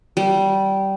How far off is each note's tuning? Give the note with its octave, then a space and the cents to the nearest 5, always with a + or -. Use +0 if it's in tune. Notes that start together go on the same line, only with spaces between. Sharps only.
G3 -15